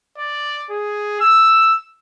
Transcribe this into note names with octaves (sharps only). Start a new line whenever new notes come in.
D5
G#4
E6